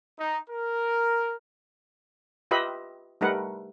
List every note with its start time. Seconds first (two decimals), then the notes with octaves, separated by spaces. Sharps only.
0.18 D#4
0.49 A#4
2.51 F4 G4 B4 D#5 E5 B5
3.21 G3 A3 D#4 A#4 B4 F#5